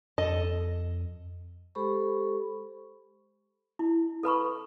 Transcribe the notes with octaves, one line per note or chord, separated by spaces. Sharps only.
F2 A4 D#5
G#3 G4 A4 C5 B5 C#6
E4
A4 B4 B5 C#6